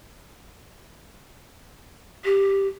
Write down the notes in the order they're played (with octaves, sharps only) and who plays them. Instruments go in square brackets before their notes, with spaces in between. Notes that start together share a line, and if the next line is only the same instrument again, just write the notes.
[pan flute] G4